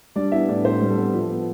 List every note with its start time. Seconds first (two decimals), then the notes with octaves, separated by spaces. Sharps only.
0.16 G3 D4 D5
0.32 B3 E4 E5
0.48 A2 D4 D5
0.65 A2 C4 C5
0.81 G3
0.89 A4
0.98 B3
1.14 F3
1.30 B3